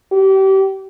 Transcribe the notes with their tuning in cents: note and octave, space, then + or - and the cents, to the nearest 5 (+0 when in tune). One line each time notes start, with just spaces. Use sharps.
G4 -30